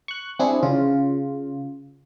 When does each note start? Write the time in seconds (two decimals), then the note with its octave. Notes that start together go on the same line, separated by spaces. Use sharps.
0.08 C#6 F#6
0.39 C4 D4 E4 G#4
0.63 C#3 F4